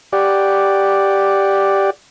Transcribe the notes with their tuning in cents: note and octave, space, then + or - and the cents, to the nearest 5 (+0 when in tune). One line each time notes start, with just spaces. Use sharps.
G4 +0 D5 +0 F#5 +0